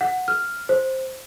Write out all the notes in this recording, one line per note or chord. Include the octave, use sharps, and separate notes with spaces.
F#5
F6
C5